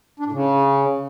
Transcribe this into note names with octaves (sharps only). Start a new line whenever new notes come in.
D4
A2
C#3